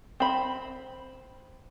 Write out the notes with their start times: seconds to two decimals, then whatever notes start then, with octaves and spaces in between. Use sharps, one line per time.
0.20 C4 B5